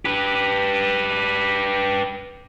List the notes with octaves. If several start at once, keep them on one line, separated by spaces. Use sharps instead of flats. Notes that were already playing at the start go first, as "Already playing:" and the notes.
G4 B4